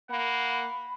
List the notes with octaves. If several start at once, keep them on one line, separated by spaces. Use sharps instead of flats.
A#3 F#5 B5